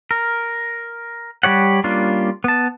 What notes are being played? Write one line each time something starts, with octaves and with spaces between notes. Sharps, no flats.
A#4
G3 G4 C#5 F#5
G3 A#3 C#4 D4 F4
B3 A5